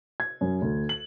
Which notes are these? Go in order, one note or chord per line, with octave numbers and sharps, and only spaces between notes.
G#6
F#2
D2
F#7